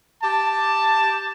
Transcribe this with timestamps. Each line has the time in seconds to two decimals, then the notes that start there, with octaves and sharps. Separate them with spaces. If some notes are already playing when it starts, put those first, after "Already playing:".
0.22 G4 A5